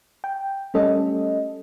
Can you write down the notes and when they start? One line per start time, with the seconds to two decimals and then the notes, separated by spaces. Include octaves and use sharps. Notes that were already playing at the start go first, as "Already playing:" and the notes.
0.24 G5
0.74 G3 A3 C#4 A4 D#5